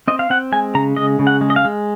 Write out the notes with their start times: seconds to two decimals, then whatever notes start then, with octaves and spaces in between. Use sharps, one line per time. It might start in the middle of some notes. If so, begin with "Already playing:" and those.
0.08 C4 D#5
0.19 F5
0.30 C4 F#5
0.52 G#3 G#5
0.75 C#3 A#5
0.96 G#3 D#5
1.19 C#3
1.27 F#5
1.41 G#3
1.50 D#5
1.56 F5
1.65 G#3